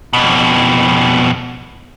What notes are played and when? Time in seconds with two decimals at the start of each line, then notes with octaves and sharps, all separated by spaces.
0.13 F2 B2